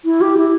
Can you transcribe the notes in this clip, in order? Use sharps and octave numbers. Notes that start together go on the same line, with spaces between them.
E4
G4
E4